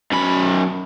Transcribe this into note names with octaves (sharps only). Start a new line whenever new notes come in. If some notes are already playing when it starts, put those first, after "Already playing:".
F#2 B5